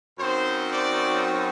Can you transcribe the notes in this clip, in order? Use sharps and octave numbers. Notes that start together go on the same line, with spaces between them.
F#2 F#3 C4 D#4 C5
D5